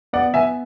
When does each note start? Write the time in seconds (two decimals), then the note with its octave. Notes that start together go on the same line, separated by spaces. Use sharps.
0.13 B3 D5 F#5
0.34 E5 G#5